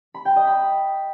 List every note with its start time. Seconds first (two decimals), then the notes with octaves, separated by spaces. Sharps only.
0.14 B5
0.25 G5
0.36 D#5
0.47 B5